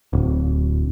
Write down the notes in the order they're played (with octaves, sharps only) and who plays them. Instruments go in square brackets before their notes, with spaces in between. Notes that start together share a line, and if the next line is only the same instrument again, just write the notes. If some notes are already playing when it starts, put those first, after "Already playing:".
[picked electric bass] D1